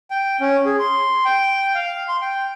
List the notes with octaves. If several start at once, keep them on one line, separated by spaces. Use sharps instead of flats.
G5
C#4
G#4
C6
G5
F5
C6
G5